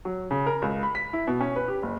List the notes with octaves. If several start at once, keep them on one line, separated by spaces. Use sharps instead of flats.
F#3
C#3
A#4
C#2
B5
B6
E4
B2
C#4
B4
G4
F#1